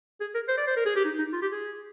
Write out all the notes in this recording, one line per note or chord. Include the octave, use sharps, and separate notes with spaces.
G#4
A#4
C5
D5
C5
A#4
G#4
G4
D#4
D#4
F4
G4
G#4